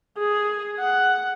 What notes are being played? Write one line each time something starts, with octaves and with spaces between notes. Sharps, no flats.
G#4
F#5